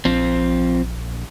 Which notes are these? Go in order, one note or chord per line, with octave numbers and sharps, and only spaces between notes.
A#1 F3 C4